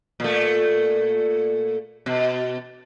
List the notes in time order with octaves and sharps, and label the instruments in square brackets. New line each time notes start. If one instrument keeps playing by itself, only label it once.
[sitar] A#2 A3
B2